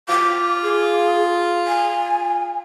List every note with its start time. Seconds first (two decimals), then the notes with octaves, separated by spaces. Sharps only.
0.09 F4 D6
0.63 G#4
1.67 G#5